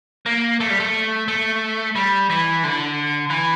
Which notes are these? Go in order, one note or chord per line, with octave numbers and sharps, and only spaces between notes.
A#3
A3
G3
A3
A3
G3
E3
D3
E3